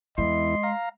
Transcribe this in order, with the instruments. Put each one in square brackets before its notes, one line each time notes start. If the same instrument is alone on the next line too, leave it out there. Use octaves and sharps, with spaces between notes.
[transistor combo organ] E2 E4 [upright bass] G#3 [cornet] D#5 [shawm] C6
[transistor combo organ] F5 A#5